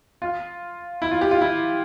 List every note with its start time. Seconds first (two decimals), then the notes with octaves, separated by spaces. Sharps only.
0.22 F4
1.02 E4
1.11 F4
1.21 G4
1.31 F4
1.41 E4